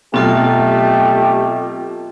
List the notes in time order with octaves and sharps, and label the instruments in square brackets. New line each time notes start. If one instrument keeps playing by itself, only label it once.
[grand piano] B2 F#3 [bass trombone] A3 [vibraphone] C4 F4 A4 [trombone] G4